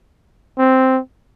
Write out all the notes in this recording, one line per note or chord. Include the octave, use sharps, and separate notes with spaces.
C4